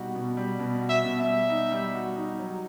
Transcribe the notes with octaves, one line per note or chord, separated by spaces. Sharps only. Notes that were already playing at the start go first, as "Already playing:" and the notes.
Already playing: B2 G3 D#4 F#4
B2
G3
B2
F#4
E5
B2
E5
G3
D#4
G3
F#4
D#4
F#3